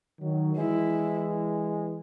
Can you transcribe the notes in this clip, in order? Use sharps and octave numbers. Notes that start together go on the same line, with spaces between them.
D#3 F#3
E3 G#3 E4